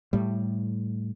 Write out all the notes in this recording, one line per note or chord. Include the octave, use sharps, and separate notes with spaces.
A2 G3